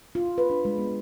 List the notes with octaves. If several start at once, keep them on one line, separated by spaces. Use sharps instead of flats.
F4
B4
D4
G#3
B3